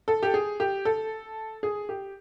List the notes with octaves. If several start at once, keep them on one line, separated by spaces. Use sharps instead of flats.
A4
G4
G#4
G4
A4
G#4
G4